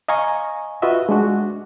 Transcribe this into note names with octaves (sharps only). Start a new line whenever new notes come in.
D#5 F5 G#5 A#5 C#6
F4 F#4 B4 D#5 E5
G#3 D4 F#4